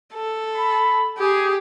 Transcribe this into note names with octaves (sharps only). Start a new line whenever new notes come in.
A4
B5
G4 G#4